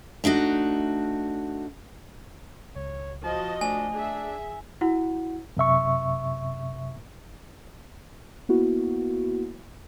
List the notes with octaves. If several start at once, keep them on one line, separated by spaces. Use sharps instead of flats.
A3 D4 D#4 F#4
C#2 C#5
F3 F#4 D#5 A5
A3 D4 G#5
D4 G#4 E5
E4 F#4 F#5
F#2 C3 E5 C#6
A#3 B3 E4 F#4